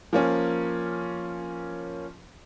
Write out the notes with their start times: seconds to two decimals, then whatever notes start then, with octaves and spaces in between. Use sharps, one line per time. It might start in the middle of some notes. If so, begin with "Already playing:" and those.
0.13 F3 A#3 C#4